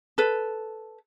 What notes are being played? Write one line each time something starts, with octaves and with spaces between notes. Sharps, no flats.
A4 B4